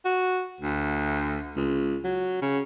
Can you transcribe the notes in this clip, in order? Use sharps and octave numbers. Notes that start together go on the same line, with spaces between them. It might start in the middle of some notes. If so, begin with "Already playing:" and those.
F#4
D2
C#2
F#3
C#3